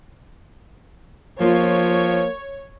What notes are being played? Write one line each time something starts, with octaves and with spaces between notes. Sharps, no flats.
F3 A#3 F4 C#5